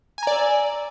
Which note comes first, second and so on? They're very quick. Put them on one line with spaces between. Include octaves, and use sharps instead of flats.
G#5 A#5 D5 E6